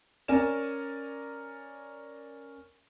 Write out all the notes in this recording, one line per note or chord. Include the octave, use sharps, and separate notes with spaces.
C#4 A#4 D5 G#5 E7